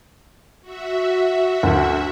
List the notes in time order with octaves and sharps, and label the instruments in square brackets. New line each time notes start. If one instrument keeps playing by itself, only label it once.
[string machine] F#4 E5
[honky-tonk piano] D2